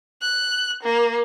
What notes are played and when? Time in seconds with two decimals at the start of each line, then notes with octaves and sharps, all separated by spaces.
0.22 F#6
0.83 A#3